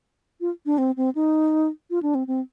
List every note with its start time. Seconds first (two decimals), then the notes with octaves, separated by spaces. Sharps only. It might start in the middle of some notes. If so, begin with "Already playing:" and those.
0.41 F4
0.66 D4
0.78 C4
0.97 C4
1.15 D#4
1.90 F4
2.03 D4
2.15 C4
2.27 C4